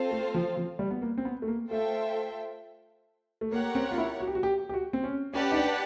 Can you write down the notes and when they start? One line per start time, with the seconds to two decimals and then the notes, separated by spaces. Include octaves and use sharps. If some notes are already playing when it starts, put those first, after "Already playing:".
Already playing: C4 F4 A4 C5 F5
0.11 A3
0.34 F3
0.57 F3
0.79 G3
0.91 B3
1.02 A#3
1.18 C4
1.25 B3
1.42 A3
1.48 A#3
1.70 A3 F4 A4 C5 E5 G5
3.41 A3
3.52 A#3 G4 A#4 C#5 F#5
3.75 C4
3.91 F4
3.98 E4
4.21 F#4
4.27 G4
4.35 F#4
4.43 G4
4.69 G4
4.74 F#4
4.93 C4
5.04 C#4
5.34 C#4 G4 B4 D5 F#5 A5
5.52 D#4
5.57 D4